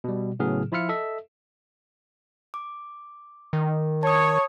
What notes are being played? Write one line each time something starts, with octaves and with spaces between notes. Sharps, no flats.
B2 G3
A2 C#3 F#3 B3 G#4 F6
F3 E4 F4 E5 F6 C#7
A4 D#5 E5
D6
D#3
C#5 A5 D#6